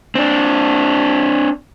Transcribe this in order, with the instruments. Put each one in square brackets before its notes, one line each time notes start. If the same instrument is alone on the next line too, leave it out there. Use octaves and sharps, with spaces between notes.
[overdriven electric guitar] C4 D4